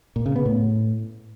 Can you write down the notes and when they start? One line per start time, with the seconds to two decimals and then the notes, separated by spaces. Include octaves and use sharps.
0.16 A#2
0.26 C#3
0.36 B3
0.46 A2